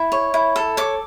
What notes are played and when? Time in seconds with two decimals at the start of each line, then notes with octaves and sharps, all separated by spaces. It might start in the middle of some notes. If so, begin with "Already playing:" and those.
Already playing: E4
0.12 C#5
0.34 E4
0.56 A4
0.77 C#5 D6